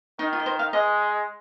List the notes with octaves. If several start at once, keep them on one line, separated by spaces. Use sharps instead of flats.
D#3 D#4
F4
D#5
C5
F5
G#3 D#5